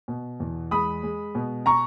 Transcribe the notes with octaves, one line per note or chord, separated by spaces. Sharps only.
B2
E2
G#3 B5 D#6
G#3
B2
A#5 C#6